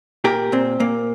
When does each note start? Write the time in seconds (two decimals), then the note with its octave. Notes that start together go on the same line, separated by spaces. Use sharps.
0.24 A#2 G4 A#4
0.52 A#2 C4
0.80 A#2 A#3